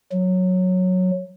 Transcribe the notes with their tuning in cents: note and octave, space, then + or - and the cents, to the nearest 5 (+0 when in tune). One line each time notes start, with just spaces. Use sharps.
F#3 -10